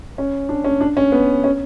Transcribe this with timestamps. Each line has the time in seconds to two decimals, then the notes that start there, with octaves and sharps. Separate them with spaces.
0.18 C#4
0.49 D4
0.64 C#4
0.81 D4
0.97 C#4
1.12 B3
1.44 C#4